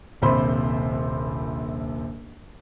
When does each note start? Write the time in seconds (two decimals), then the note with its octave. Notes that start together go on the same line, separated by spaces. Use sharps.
0.22 D#1 A#1 C3 C5 B5 C6